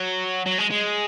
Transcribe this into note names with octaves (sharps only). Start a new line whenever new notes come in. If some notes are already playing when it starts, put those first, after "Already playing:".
Already playing: F#3
F#3
G#3
G#3